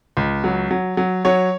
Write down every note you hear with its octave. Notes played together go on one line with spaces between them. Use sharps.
C#2
F#3
F#3
F#3
F#3 C#5